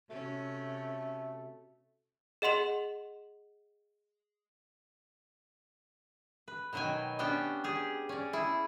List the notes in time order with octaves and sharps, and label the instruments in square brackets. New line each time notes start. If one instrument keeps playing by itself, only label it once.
[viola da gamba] C3 C#4 [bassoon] A3 [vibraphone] F#4
[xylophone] G#4 D#5 F#5 C6 F7
[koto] B4
B2 D#3 F#3 G5 G#5
B3 C#4 D4 F#4 G4 G5
G4 G#4
C#4 D5
E4 G#4